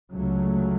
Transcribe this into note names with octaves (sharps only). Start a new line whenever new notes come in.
C#2 C#3 F#3 A3